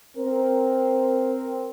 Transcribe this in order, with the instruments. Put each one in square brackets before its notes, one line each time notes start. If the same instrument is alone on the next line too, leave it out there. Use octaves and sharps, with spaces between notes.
[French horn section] C4 A#4